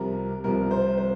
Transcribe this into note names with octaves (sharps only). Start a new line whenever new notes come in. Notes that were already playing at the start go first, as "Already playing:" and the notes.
Already playing: C2 C3 F3 A#4
C2 C3 F3 A#4
C5
C5